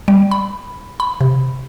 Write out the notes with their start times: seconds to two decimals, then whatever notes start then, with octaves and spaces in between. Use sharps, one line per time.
0.08 G3
0.31 B5
1.00 B5
1.21 C3